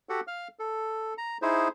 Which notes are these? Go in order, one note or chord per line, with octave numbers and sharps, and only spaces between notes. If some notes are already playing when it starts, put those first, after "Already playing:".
F#4 G4 A4 F#5
F5 F6
A4
A#5
D#4 E4 G#4 C5